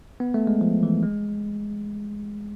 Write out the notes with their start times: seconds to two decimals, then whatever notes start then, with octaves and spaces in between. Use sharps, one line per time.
0.20 B3
0.34 A3
0.47 G#3
0.61 F3
0.83 E3
1.03 G#3